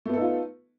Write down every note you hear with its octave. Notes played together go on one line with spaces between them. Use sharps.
A3 B3 D#4 F4 A4